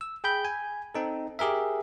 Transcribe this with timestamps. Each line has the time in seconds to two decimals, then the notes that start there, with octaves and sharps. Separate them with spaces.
0.01 E6
0.24 G#4 G5 B5 G6
0.45 G#5
0.95 C4 D#4 A4
1.39 G4 G#4 A#4 E5